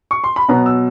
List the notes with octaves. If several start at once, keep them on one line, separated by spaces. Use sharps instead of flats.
C#6
C6
B5
B2 F#3 B3 A#5
E6